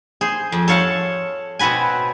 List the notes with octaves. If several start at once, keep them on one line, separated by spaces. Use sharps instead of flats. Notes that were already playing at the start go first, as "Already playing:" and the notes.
G#4 C5
F2
A4 C#5 F5 F#5 A5
B2 C4 F#4 B4 G#5